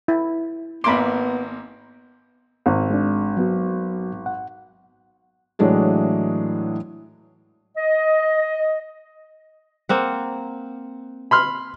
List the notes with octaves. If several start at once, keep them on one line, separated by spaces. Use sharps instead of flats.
E4
G#1 A#3 B3 B5 C6 D6
G#1
G#3 D4
F#3 B3 F#4
F#5
A2 E3 F#3 G#3 D4 G#4
D#5
A#3 C4 F#5
B5 C6 F6